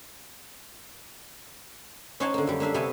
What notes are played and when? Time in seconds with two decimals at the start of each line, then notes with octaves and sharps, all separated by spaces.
2.20 C#4 D#4 C5 C#5 F#5 A5
2.34 D3 A#3
2.47 F#2 G3
2.60 A#3 D4 E5 F5
2.74 C3 B3 C#5 E5 G#5 A5